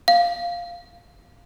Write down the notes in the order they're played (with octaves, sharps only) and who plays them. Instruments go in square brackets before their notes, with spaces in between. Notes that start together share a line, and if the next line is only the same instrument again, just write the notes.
[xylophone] F5